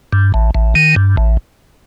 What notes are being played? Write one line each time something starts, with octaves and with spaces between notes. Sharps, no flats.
G2
A1
A1
D#3
G2
A1